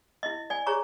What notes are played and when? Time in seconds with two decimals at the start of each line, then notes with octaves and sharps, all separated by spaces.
0.23 E4 D#5
0.50 D5 G#5
0.66 G#4 C#5 A#5 C#6